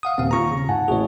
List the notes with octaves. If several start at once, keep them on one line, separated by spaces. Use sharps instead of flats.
F5 F#5 D#6
D#1 C4 F5
D#2 F4 A#5 C#6 A#6
C#3
G#2 F#5 G#5 A5
A1 E4 F#4 G#4 C#5